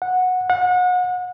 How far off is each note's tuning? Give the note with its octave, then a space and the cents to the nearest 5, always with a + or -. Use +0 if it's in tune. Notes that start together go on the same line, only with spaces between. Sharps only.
F#5 -15
F#5 -35